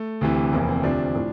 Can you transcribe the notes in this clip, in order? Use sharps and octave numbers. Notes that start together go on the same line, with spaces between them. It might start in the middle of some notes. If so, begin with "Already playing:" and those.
Already playing: A3
D2 C3 E3
F1 E2 E3 A#3
C4
D2 C3 F3 D4
A2 F3